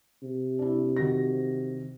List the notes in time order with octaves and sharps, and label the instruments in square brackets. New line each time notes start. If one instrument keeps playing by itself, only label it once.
[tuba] C3
[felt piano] D4 E4
D#3 F#4 A#6